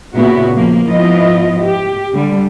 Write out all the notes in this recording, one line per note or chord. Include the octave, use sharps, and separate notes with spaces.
A#2 C#3 B3 E4 F#4
F3 A#3
G#2 F3 B3 E4 F4 D#5
G4
D3 G3